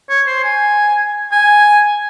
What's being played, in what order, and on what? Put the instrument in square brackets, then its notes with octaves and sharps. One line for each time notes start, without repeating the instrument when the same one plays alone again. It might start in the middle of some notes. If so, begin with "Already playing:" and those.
[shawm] C#5
C5
G#5
G#5